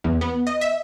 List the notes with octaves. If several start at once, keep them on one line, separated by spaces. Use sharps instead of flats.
E2
B3
D#5
E5